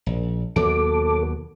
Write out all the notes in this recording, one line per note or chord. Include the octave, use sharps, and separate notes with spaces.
A#1
D#2 B2 F#3 A4 D6